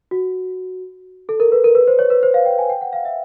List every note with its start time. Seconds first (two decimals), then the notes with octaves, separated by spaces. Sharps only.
0.11 F#4
1.29 A4
1.40 A#4
1.52 B4
1.64 A#4
1.75 B4
1.87 C5
1.99 C#5
2.10 B4
2.23 C5
2.34 F5
2.46 G5
2.59 G#5
2.70 G5
2.81 F#5
2.93 F5
3.05 E5